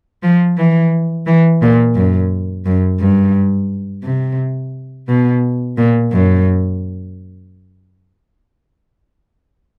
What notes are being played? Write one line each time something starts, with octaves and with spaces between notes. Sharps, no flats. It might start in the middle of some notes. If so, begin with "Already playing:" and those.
F3
E3
E3
A#2
F#2
F#2
G2
C3
B2
A#2
F#2